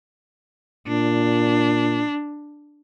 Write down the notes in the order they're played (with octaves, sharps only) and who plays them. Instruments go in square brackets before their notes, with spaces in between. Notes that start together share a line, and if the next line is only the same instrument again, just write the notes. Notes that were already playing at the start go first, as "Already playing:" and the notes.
[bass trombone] A#2 [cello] D4